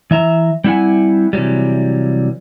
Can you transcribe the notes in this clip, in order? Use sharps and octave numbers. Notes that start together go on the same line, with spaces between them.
E3 E5 A#5
G3 C4 E4 F4 F#5 G#5
C3 E3 F#3 G3